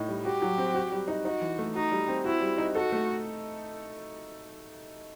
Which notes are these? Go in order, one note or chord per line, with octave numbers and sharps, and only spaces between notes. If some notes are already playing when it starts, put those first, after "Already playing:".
Already playing: A2 D#4
G3
F#4 G4
F#3
C4
F#4
G3
D#4
D#4 F#4
E3
A3
D#4 F#4
G3
C4
E4 F#4
G3
D#4
F#4 A4
A3